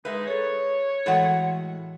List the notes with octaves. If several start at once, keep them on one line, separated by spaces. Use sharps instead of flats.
G#3 D#4 G#4 B4 E5
G#4 A4 C#5
A2 E3 G#3 F#4 A4 F#5